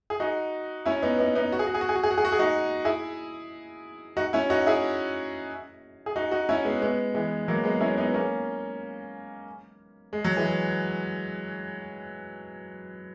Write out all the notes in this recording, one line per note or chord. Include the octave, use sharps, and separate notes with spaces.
G#4
D#4 F#4
C#4 E4
B3 D#4
B3 D#4
B3 D#4
F#4
G#4
F#4
G#4
F#4
G#4
F#4
G#4
F#4
G#4
F#4
G#4
D#4 F#4
E4 G#4
D#4 F#4
C#4 E4
D#4 F#4
E4 G#4
G#4
D#4 F#4
D#4 F#4
C#4 E4
G#3 B3
G#3 B3
E3 G#3
F#3 A#3
G#3 B3
C#4 E4
B3 D#4
A#3 C#4
G#3
F#3
E3 G#3